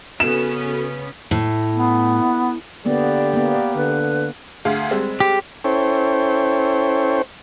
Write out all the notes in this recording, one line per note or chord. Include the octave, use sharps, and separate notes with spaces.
C#3 B3 C#4 F#4 A4 E7
A2
B3
D3 A#3 B3 G4 D5
A#3 B3
D3 B4
D2 G#4 F5
G3 G#3 C4
G4
C#4 E4 A4 C5 C#5 G5